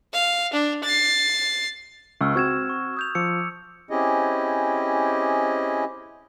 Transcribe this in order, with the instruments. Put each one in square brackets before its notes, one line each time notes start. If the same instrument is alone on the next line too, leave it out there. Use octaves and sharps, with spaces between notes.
[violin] F5
D4
A6 C7
[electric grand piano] C#2 [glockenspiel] C#6 E6 F6
[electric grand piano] C4 F#4 [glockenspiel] C#6 G#6 E7
[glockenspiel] C#6
D#6 G6 F7
[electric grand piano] F3 [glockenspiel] D6 E6 C#7
[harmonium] C4 C#4 E4 G4 G#4 D#5